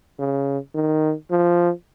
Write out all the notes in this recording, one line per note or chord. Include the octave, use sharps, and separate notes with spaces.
C#3
D#3
F3